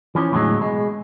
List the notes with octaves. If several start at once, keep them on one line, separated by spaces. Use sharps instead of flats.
E3 F3 C#4
E2 A2 D3 E3 F#3 G#3
B2 G#3